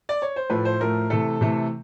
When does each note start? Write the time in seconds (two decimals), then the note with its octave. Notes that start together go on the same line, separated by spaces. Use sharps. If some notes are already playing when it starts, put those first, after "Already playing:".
0.09 D5
0.22 C#5
0.36 C5
0.50 A2 F3 A3 B4
0.65 C5
0.80 A2 F3 A3 A#4
1.10 C3 E3 A3 A4
1.41 C3 E3 A3